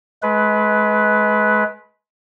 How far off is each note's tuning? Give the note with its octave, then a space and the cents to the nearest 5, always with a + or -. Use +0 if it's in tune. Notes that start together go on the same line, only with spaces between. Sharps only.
G#3 +35 B4 +0